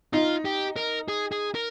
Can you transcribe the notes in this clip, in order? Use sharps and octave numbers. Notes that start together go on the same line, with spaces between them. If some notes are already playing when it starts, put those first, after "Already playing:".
D#4 F4
G4
A#4
G#4
G#4
A#4